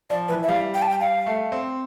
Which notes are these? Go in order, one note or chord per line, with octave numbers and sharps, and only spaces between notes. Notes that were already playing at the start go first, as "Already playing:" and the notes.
F3 D5
E3 B4
E5
G3 F5
G5
A5
G5
F5
A3
C4